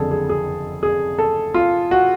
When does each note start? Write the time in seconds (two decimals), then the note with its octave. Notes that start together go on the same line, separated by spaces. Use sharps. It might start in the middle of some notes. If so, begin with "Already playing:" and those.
Already playing: F#1 F2 D3 G#4 A4
0.11 G#4
0.29 G#4
0.83 G#4
1.19 A4
1.54 F4
1.91 F#4